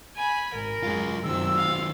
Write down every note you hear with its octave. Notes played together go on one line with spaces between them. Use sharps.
G#5 B5
G#1 A#4
F#2 G#3 F4 G#4
F#2 D#3 F#3 C4 E6
F5